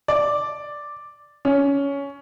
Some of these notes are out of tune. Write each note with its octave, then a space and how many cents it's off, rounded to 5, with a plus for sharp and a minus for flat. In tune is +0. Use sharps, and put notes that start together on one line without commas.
D5 +0
C#4 +15